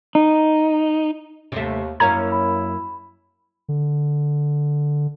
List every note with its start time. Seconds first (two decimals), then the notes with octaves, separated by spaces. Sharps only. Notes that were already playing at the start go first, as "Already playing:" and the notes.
0.15 D#4
1.52 D#2 C3 A3
2.00 F#2 A#3 C#4 E4 A#5 G#6
2.32 B5
3.69 D3